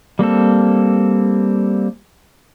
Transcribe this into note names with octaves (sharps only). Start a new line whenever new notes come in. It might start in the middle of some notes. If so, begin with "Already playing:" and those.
G3 A#3 C4 A4